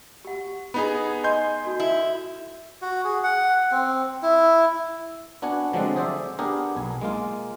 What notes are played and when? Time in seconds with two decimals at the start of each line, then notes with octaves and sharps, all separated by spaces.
0.25 G4 F#5
0.74 B3 D#4 G#4 B5
1.24 D#5 G#5 C6 G6
1.64 D#4 F#4 A4
1.80 E4
2.82 F#4
3.04 G#4
3.24 F#5
3.72 C4
4.23 E4
5.42 B3 D4 F#4 F#5 G#5
5.73 D3 F3 F#3 G#3 C4 D4
5.96 G#4 C5 D5 E5
6.39 B3 D4 G4 G#4 A#4
6.77 B1 G#5
7.01 G#3 A#3 F4